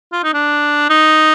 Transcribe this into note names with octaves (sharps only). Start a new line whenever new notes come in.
F4
D#4
D4
D#4